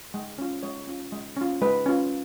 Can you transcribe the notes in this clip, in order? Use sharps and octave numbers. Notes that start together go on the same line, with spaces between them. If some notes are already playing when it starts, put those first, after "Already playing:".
G#3
C#4 F4
G#3 C#5
C#4 F4
G#3
C#4 F4
G#3 B4
C#4 F4